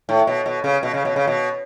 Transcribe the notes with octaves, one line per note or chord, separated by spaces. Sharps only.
A2
B2
B2
C#3
B2
C#3
B2
C#3
B2